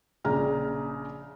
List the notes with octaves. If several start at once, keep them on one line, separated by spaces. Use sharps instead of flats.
A#1 C#3 A#5 F6